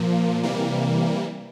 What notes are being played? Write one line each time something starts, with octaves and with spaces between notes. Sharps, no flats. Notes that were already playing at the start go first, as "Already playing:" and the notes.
Already playing: A#2 F3 A#3
C3 E3 G3 A#3